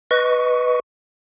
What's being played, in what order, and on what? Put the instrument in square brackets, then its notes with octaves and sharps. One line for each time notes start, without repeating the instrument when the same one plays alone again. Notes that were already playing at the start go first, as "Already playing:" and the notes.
[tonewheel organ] B4 D#5 C#6